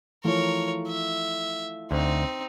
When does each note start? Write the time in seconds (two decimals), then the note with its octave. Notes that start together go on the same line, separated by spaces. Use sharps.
0.24 E3 F3 A3 A#4 C#5
0.88 E5
1.91 D2 C4 D#4